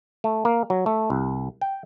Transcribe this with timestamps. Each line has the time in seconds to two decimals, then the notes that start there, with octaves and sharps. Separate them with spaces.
0.24 A3
0.45 A#3
0.70 F#3
0.86 A3
1.10 C2
1.61 G5